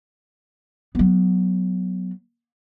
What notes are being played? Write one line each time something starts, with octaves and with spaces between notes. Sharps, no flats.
F#3 B3